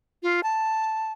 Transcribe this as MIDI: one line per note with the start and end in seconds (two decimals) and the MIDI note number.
0.23 0.41 65
0.43 1.12 81